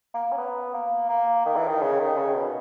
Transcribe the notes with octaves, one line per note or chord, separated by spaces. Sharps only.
A#3
C#4
B3
A#3
A#3
D#3
E3
D#3
C#3
D#3
C#3
B2